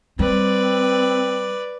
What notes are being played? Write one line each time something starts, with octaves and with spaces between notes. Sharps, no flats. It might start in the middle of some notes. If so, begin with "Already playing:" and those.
G3 C4 B4 D5